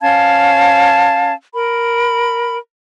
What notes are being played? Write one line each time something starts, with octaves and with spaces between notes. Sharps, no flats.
C#4 F5 A5 G#6
A#4 B5